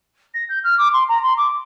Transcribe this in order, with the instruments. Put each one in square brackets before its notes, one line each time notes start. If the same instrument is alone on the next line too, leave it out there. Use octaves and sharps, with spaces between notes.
[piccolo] A#6
G6
F6
D6
C6
A#5
C6
D6